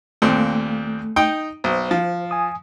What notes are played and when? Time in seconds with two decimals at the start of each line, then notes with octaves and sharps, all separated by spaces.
0.22 D#2 A#2 A3 C4
1.16 D#4 G5 D#6
1.64 B1 C5
1.91 F3
2.31 G#5 D#6